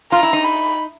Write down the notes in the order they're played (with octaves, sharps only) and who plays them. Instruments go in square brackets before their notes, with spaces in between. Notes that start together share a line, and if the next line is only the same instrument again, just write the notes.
[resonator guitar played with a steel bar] F4 [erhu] A#5
[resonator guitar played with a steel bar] E4
D#4
[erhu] B5